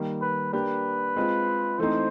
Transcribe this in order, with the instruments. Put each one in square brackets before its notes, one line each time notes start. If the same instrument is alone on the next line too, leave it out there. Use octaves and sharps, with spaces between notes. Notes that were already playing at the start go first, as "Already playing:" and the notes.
Already playing: [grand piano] D#3 G3 A#3
[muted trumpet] B4
[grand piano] A#3 D4 G4 [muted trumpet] B4
[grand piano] G#3 C4 F4
[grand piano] E3 A3 C4 D#4 [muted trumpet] C5